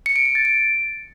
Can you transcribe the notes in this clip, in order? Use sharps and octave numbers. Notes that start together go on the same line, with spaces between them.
C#7
D7
C#7
A6
D7